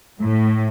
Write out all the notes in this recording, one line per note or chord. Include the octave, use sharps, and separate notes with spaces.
A2